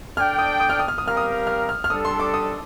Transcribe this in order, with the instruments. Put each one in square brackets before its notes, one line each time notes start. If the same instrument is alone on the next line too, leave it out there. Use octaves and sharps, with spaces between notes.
[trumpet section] D4 A4 D5 G5 [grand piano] F6
[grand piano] D#6
D#6
F6
D#6
F6
D#6
[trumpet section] G3 C4 G4 A#4 F5 [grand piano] F6
[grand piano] D#6
F6
F6
F6
[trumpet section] G3 D4 A4 [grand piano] D#6
[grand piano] C6
D6
D#6